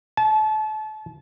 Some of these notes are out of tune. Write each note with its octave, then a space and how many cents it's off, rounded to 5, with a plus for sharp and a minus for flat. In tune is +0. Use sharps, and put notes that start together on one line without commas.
A5 -30